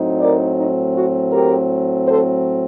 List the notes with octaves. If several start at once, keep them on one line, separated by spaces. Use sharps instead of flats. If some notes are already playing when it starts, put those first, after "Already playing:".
Already playing: A2 F#3 C4 D#4
A#4 D5
D#4
F#4
G4 A#4
A4 C5